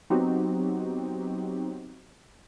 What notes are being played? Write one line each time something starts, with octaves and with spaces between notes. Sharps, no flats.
F#3 B3 C4 D#4 F#4 G4